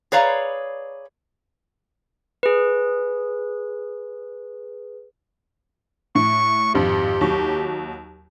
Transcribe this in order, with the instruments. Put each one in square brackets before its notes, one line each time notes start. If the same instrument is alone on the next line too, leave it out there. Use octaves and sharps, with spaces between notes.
[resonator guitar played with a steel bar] G#4 B4 C#5 D5 F5 A#5
[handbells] G#4 B4
[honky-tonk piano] A2 [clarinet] C#6
[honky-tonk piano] G#1 F2 [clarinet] G4
[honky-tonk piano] D#2 F#3 C#6